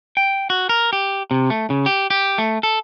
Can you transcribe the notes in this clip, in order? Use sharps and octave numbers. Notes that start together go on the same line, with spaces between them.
G5
F#4
A#4
G4
C3
A3
C#3
G4
G4
A3
A4